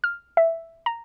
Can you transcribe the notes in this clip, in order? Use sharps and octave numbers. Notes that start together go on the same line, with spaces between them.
F6
E5
A#5